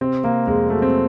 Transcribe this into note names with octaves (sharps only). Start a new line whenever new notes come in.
C3 C4
C3 A#3
F2 G#3
F#3 A3
C4